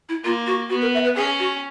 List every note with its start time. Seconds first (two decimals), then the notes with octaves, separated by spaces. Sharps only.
0.09 E4
0.24 A#3 F4
0.47 F#4
0.70 B3 F#4
0.82 A#4
0.94 E5
1.04 B4
1.16 C#4 G#4
1.39 F#4